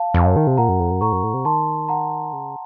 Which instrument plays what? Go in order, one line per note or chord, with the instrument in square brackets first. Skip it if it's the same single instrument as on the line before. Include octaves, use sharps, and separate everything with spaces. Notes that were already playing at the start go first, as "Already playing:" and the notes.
Already playing: [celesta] F5 A5
[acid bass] F2
F#2
D#3
C3
[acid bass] A#2 [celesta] F#5 A#5
[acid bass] F#2
F2
F#2
[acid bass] A2 [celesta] A#5 C#6
[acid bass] F#2
A2
C3
[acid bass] D#3 [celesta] A5 C6
[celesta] F#5 A#5
[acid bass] C#3